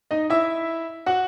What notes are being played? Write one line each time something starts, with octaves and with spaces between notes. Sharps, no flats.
D#4 D#5
E4 E5
F#4 F#5